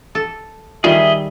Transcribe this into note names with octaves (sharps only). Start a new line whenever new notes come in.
A4
D#3 G3 F4 G#4 D#5 E5